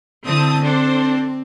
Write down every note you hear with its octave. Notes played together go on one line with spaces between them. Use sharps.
D3 C4 E4 A5 D#6
C4 D4 A4 C5